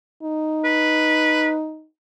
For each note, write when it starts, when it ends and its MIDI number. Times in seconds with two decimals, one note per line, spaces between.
0.23 1.87 63
0.64 1.52 71